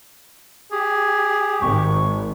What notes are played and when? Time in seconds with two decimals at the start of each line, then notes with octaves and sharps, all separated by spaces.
0.72 G4 G#4
1.62 G#1 C#6